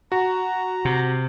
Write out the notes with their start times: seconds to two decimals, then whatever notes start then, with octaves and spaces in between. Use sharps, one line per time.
0.12 F#4 A#5
0.85 C3